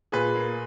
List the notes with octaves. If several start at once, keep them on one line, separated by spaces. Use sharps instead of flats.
A#2 G#4 B4
A#3